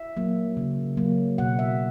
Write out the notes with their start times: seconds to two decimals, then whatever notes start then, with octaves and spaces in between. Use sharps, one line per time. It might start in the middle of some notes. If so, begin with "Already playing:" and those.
Already playing: E5
0.17 F#3 A#3
0.57 C#3
0.97 F#3 A#3
1.38 B2 F#5
1.59 E5